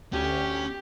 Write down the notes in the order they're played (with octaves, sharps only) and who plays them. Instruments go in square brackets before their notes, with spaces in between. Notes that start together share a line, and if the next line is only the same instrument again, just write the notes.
[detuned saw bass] D2 [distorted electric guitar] C#4 [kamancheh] G4